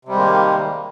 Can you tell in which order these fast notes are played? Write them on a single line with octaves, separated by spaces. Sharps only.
C3 G3 G#3 D#3 A#3